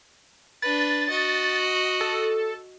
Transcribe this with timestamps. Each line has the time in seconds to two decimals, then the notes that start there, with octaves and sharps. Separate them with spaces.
0.62 D4 B4 A6
1.10 F#4 D#5
2.01 A4